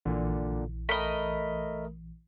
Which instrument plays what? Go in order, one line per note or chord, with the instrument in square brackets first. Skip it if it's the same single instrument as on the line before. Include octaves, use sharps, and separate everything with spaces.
[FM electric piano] A#1 E3 [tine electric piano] A#2 D3
[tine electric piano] A3 A#4 [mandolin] D#5 B5